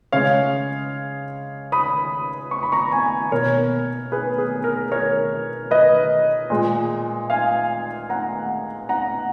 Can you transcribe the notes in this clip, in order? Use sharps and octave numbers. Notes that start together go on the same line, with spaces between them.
C#3 G#3 C#5 F5
B5 D#6
C#6
B5
A#5 C#6
G#5 B5
B2 A#3 A#4 C#5
G#4 B4
G#4
A#4
A#4 C#5
B4 D#5
A#2 G#3
F5 G#5
F#5 A#5
F#5 A#5